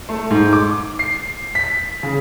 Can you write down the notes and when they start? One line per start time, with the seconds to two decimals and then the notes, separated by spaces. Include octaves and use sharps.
0.09 A3
0.30 G#2
0.53 D6
0.99 C7
1.55 B6
2.03 C#3